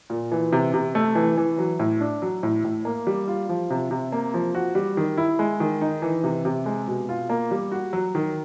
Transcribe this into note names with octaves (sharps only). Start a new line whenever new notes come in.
A#2
E3
C3
C3
A3
E3
E3
F#3
A2
D4
F#3
A2
A2
A#3
G3
F4
F3
C3
C3
A#3
F3
F#4
G3
D#3
E4
G#3
D#3
D#4
E3
C3
C3
G#3
B2
F4
A#3
G3
F#4
F#3
D#3